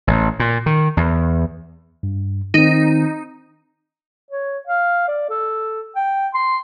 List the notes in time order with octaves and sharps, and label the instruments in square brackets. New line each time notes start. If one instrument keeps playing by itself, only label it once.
[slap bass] A1
A#2
D#3
E2
[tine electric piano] G2
[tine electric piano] D#3 C4 [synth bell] D#4
[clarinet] C#5
F5
D5
A4
G5
C6